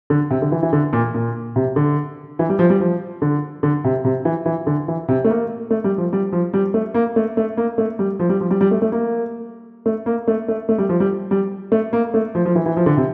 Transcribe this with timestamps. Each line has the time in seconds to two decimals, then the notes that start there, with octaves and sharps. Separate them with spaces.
0.10 D3
0.30 C3
0.42 D3
0.52 E3
0.63 E3
0.73 D3
0.93 A#2
1.14 A#2
1.56 C3
1.76 D3
2.39 E3
2.49 G3
2.59 F3
2.70 G3
2.80 F3
3.22 D3
3.63 D3
3.84 C3
4.05 C3
4.25 E3
4.46 E3
4.67 D3
4.88 E3
5.08 C3
5.24 A3
5.29 A#3
5.71 A3
5.84 G3
5.98 F3
6.13 G3
6.32 F3
6.54 G3
6.74 A3
6.94 A#3
7.16 A3
7.37 A3
7.57 A#3
7.78 A3
7.99 G3
8.19 F3
8.29 G3
8.40 F3
8.50 G3
8.61 G3
8.71 A3
8.82 A3
8.92 A#3
9.86 A3
10.06 A#3
10.28 A3
10.48 A3
10.69 A3
10.78 G3
10.89 F3
11.00 G3
11.31 G3
11.72 A3
11.93 A#3
12.14 A3
12.35 F3
12.45 F3
12.55 E3
12.66 E3
12.77 F3
12.86 D3
12.97 C3